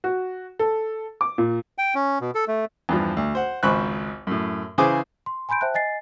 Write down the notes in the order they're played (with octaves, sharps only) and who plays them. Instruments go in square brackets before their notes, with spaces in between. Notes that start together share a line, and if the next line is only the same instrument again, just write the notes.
[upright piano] F#4
A4
D6
A#2
[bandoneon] G5
C#4
B2
A4
A3
[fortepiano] E2 G2 F3
D2
C5 F#5
G#1 C#2 C5 B5 C#6 F#6
F#2 A2
C#3 E3 G#4 C5 G#5 D6
[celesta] C6
G#5 B5 C6 G6 D7
C5 E5 G5 A5 F#6
D#5 G#5 A6 C7